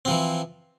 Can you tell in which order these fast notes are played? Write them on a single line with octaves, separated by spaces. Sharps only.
C4 F3 E3